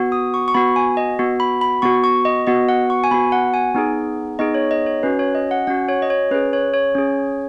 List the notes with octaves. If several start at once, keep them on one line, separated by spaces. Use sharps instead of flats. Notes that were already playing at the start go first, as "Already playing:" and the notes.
Already playing: B3 F#4
D#6
C#6
C#6
B3 F#4 B5
G#5
D#5
B3 F#4
B5
B5
B3 F#4 C#6
C#6
D#5
B3 F#4 D#5
F#5
C#6
G#5
B3 F#4 B5
F#5
G#5
B3 D#4 G#4
B3 D#4 G#4 D#5
C#5
D#5
C#5
C#4 F#4 B4
C#5
D#5
F#5
C#4 F#4 F#5
C#5
D#5
C#5
C#4 G#4 B4
C#5
C#5
C#4 G#4